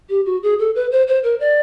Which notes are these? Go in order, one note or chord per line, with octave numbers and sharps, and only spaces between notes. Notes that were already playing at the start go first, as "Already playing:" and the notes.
G4
F#4
G#4
A4
B4
C5
C5
A#4
D5